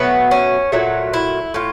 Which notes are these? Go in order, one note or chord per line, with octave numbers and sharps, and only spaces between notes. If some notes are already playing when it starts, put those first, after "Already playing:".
Already playing: B2 F#3 A3 B3
C#4
A#2 F#3 A3
E4
A2 F4